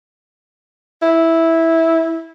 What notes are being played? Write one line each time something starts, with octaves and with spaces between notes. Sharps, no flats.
E4